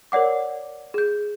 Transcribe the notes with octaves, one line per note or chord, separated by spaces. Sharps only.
A#4 C#5 D5 F#5 D6
G#4 G6